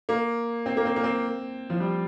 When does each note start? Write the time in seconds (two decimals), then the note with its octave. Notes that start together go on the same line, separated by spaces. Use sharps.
0.09 A#3
0.66 C4
0.77 A#3
0.85 C4
0.96 A#3
1.04 C4
1.70 F3
1.80 G3